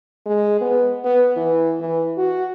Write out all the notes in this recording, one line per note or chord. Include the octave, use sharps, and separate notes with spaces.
G#3
B3
B3
E3
E3
F#4